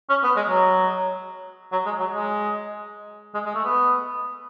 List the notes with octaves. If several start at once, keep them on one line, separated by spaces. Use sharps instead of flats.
C#4
B3
G#3
F#3
F#3
G#3
F#3
G#3
G#3
G#3
A3
B3